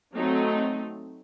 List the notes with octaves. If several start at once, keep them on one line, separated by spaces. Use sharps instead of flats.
F#3 A3 C4 D#4